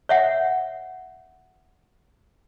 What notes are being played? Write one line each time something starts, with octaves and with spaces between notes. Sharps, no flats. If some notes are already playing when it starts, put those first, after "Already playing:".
C#5 E5 F#5